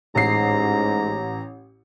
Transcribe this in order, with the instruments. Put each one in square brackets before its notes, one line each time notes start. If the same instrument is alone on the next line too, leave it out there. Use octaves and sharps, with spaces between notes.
[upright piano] A1 C7 [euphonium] G#2 [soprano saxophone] A#5